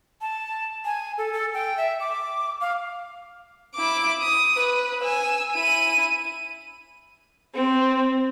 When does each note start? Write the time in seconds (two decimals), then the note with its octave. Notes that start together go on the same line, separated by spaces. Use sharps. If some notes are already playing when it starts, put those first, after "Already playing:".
0.21 A5
0.85 G#5
1.18 A4
1.33 A4
1.54 G5
1.77 E5
2.00 D6
2.61 F5
3.75 E4 D6
4.21 D#6
4.55 B4
5.03 G#5 E6
5.53 E4 D#7
7.54 C4